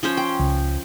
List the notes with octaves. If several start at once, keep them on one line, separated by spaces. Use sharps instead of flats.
F3 C#4 C5
G5
C#2